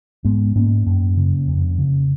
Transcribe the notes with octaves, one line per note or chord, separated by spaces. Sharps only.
G#2 G#3 B3
G#2 A#3 C#4
F#2
C#3
F2
C#3